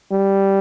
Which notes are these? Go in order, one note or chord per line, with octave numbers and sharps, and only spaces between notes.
G3